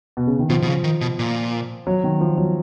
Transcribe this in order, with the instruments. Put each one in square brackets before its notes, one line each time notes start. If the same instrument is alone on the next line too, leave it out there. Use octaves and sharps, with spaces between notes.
[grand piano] B2
C#3
D#3
[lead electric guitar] B2 [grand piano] F3
[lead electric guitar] B2
C#3
D#3
B2
A#2
[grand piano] F#3
D#3
F3
F#3